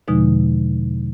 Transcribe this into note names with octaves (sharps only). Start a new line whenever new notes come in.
E2 B2 D3 F3 G#3 D#4